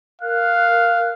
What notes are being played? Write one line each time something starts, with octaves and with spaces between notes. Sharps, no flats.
A#4 F5 F#6